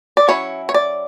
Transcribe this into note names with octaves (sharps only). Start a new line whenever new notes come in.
D5
F#3 C#4 E4 C#5
C#5
D5